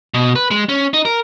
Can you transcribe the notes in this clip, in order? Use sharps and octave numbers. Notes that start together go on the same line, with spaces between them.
B2
B4
G#3
C#4
D#4
A#4